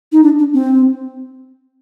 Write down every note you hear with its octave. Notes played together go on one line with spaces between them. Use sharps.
D#4
D4
D4
C4